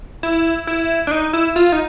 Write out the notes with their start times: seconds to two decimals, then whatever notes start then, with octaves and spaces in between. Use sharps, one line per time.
0.23 E4
0.67 E4
1.07 D4
1.11 D#4
1.33 E4
1.56 F4
1.72 D#4